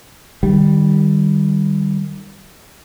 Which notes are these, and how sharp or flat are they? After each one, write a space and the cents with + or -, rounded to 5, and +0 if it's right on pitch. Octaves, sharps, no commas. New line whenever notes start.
D#3 -30 G3 +0